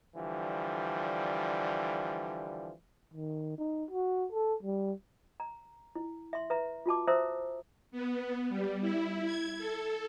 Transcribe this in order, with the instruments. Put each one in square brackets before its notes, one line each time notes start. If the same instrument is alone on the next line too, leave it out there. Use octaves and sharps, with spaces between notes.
[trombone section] D3 E3 F3 G3
[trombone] D#3
D#4
F#4
A4
G3
[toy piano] A#5
E4
E5 C6
B4 E5 A#5
F4 F#4 A5 D6
C5 E5 A#5 D#6 E6
[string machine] B3
G3
E4
G#6
A4